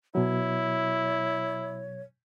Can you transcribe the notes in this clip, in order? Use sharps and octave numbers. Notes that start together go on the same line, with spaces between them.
B2 F#3 E4 C#5